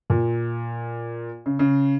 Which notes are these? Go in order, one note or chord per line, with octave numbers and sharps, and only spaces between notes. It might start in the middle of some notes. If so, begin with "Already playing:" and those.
A#2
C#3
C#3